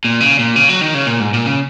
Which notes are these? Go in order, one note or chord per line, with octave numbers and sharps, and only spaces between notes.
A#2
C#3
A#2
C#3
F#3
D#3
C#3
A#2
G#2
A#2
C#3